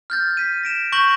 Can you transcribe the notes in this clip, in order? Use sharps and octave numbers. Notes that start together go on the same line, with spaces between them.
F6 G6 A6
B6 D#7
A#6 D7 E7
C#6 G6 A#6 F#7